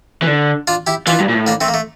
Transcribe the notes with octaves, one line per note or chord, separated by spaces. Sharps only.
E3
D3
D4 F4
E4 G4
E3 D4 F4
G2
A#2
A2
A#3 D4
A3 C4
A#3
A3